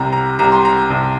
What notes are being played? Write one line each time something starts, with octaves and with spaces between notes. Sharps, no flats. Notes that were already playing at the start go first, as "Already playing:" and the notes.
Already playing: C2 C3 G3 A#5
A#5
C2 C3 G3 A#5
C6
A#5
C2 C3 G3